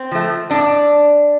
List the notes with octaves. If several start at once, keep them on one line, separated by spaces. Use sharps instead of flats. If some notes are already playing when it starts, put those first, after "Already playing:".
Already playing: C4
F3 A3
A2 D4